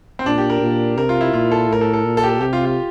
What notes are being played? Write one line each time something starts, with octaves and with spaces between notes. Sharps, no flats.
C4
A#2 D4
G4
A#4
A#2
C3 A#4
F4
E4
A#2 F4
A4
A2 A#4
A4
A4
A#2
A4
G4
A4
C3 G4
F4
F4